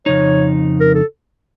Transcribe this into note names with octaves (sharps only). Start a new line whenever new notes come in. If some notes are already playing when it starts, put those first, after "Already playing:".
F2 C#3 D#4 C#5
A#4
A4